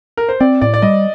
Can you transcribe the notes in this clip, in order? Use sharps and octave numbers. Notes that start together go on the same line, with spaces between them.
A#4
C5
C4 D5
A2 D5
D5
G3 D#5